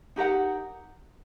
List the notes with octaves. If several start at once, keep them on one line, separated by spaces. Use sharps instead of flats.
D#4 G4 A#4 F#5